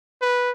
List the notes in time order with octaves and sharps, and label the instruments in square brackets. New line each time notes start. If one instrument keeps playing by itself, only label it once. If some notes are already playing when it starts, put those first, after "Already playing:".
[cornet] B4